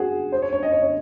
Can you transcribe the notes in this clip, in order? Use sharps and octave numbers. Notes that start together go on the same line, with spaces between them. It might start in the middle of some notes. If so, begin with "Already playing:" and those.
Already playing: F#4 G#4
C5
C#5
C#5
D#5
C#5
C#5